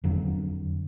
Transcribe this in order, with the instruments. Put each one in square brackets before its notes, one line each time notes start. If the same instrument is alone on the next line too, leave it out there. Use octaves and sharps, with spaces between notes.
[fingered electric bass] F2 D3 F#3